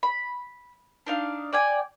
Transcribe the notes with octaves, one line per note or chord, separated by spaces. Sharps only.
B5
D4 D#4 F5
D5 G5 G#5